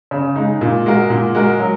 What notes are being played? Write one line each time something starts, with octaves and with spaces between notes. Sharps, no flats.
C#3
G#3 D#4
A#2
G#3 F#4 A#4
A#2
G#3 F#4 A#4
F#3